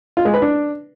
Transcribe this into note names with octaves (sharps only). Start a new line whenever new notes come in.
F4
G#3
B4
D4